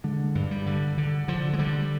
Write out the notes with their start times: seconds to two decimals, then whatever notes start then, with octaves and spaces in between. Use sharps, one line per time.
0.04 D3 G#3
0.35 G2
0.51 G3
0.66 D3
0.98 D3
1.28 D3 F3
1.53 G#3
1.59 D3 G3